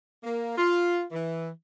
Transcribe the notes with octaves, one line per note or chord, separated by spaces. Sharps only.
A#3
F4
E3